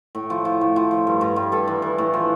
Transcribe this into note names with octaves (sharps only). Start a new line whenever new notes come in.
A2
F3
F3
A2
F3
F3
G2
G2
G2
G2 A4
E3
E3
A2
F3